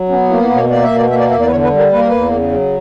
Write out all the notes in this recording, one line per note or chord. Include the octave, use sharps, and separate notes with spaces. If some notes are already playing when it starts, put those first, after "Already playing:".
Already playing: F#3
B3 C#4
A#3 E4
E4
B2
C#5
A#3 D5
E5
B2
D5
A#3 E5
D5
E2 E5
D5
B4
D3 C#5
B4
G3
A#4
A#3 B4
A#4
E2 B4
C#3
F#3